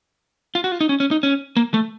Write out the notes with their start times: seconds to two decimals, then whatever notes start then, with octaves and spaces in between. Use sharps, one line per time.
0.55 F4
0.64 F#4
0.72 F4
0.81 D#4
0.89 C#4
1.00 C#4
1.11 D#4
1.23 C#4
1.57 A#3
1.74 A3